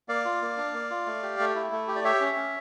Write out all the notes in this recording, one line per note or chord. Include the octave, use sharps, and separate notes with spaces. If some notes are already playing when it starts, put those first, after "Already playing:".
A#3 D5 F5
F4
A#3
D4
A#3
F4
A3
G4
A3
E4
A3
G4
D5
G4 C#5 E5
C#4
C#4